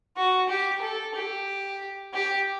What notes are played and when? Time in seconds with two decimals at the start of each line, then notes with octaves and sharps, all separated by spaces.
0.16 F#4
0.49 G4
0.82 A4
1.14 G4
2.14 G4